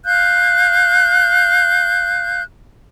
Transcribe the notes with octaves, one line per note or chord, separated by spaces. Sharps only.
F5 F#6 G6